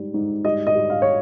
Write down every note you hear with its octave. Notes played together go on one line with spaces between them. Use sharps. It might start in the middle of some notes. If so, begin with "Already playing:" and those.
Already playing: G#2 G3
G#2
G3 D#5
D#5
G3
F5
C#5